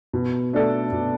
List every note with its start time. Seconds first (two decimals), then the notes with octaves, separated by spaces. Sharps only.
0.13 B2
0.53 A3 D4 A4 D5
0.92 B2